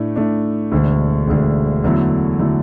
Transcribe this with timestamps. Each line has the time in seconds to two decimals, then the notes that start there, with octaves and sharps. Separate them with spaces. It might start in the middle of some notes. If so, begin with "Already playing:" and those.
Already playing: A2 A3 D4
0.16 A2 A3 D4
0.71 E1 D2 D3
1.27 E1 D2 D3
1.84 E2 D3 F#3 A3 E4
2.39 D3 F#3 A3 E4